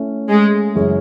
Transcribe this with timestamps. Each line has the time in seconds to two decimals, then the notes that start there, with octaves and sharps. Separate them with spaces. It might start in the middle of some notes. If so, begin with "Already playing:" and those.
Already playing: A3 C#4 E4
0.28 G#3
0.75 F#2 C#3 E3 G#3 C#4